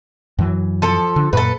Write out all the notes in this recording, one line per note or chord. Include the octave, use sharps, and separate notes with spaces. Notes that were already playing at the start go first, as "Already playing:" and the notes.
F#2 E3 F#3
F3 A4
D3
F#2 A#2 A4 B4